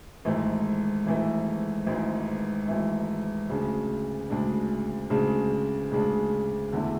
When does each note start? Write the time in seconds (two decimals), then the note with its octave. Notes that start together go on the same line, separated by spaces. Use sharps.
0.25 G#1 G#2 E3 A3
1.06 G#1 G#2 E3 A3
1.86 G#1 G#2 E3 A3
2.68 G#1 G#2 E3 A3
3.49 D2 C#3 G#3 D4
4.30 D2 C#3 G#3 D4
5.10 D2 C#3 G#3 D4
5.91 D2 C#3 G#3 D4
6.72 E2 D3 A3 E4